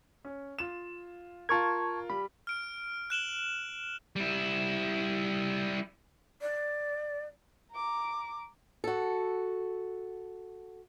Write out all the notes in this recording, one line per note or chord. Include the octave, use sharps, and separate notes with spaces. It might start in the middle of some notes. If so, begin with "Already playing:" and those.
C#4
F4 E7
F4 A#4 A5 C#6 G#6
G3 B5
F6 D7
F#6 E7 F#7 G7
G3 E4
D5
A#5 D6
F#4 A4